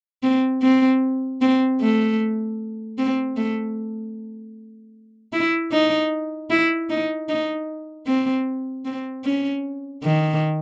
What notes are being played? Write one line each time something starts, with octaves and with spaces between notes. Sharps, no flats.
C4
C4
C4
A3
C4
A3
E4
D#4
E4
D#4
D#4
C4
C4
C#4
D#3